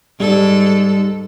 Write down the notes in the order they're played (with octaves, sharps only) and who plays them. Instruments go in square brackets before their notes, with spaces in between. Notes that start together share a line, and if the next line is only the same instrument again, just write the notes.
[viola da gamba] G#2 A4 [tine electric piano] G3